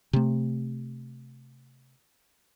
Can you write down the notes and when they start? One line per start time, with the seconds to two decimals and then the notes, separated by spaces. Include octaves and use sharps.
0.13 C3 A3